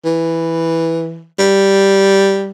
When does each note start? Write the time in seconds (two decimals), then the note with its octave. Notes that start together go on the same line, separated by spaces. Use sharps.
0.05 E3
1.39 G3